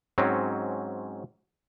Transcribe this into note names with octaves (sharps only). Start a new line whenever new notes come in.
G#2 F#3 C4 C#4